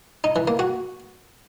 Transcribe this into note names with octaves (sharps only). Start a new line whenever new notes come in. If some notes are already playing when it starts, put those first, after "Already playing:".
D#4
E3
A#3
F#4